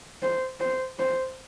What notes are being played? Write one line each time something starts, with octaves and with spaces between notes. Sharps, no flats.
C5
C5
C5